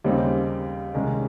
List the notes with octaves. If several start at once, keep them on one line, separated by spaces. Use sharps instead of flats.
D#2 C#3 G3 C4 D#4
C2 C3 D#3 G#3 C#4